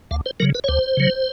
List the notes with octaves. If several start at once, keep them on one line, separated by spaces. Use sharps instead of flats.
D2 F5
C5
C#3 F#3 A#4
B4
C#5
D2 C5
C#3 F#3